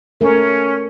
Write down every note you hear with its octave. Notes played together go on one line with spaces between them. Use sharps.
A3 C#4 A#4